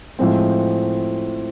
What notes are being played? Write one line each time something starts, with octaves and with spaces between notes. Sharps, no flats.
A2 F3 G#3 C4